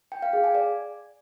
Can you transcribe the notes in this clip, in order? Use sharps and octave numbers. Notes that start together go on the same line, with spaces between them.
G5
F5
G#4
G#5
D5